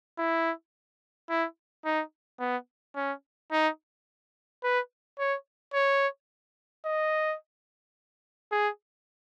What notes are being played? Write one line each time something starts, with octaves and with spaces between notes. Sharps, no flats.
E4
E4
D#4
B3
C#4
D#4
B4
C#5
C#5
D#5
G#4